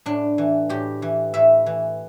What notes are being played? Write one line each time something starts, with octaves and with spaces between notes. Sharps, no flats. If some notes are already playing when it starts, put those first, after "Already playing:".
A2 D4
E3
A2 G4
E3
A2 E5
E3